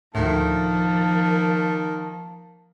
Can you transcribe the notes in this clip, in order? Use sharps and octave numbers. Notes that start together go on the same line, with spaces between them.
D2 A2 D#3 F3 A#3 A5